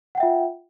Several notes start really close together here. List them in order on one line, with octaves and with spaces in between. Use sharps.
F#5 G5 E5 F4